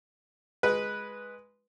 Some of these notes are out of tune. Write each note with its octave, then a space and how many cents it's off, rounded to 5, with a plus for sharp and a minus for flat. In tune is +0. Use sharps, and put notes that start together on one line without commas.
G#3 +0 B4 -5